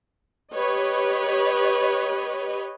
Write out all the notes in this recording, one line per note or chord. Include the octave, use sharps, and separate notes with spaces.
G4 B4 C#5 D#5